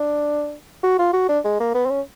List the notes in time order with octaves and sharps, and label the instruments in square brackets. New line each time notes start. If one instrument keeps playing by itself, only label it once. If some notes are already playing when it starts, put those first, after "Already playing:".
Already playing: [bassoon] D4
F#4
F4
F#4
D4
G#3
A#3
B3
C4
C#4